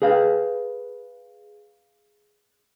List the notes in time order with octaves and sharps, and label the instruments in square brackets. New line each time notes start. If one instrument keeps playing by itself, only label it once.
[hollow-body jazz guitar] G#4 B4 F5